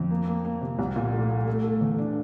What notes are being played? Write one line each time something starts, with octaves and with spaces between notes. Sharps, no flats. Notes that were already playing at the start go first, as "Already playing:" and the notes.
Already playing: F2
A#3
A#3
A#3
C3
C2
A#2
A3
A3
A3
A3
E2
D4